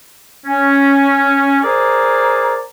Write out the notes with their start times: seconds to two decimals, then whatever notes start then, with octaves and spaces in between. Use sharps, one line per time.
0.46 C#4
1.64 G#4 A#4 C5 D5 G#5 A#5